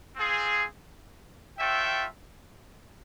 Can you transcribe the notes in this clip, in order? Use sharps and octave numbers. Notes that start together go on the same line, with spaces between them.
C4 F4 G#4
F4 A4 C#5 E5 G5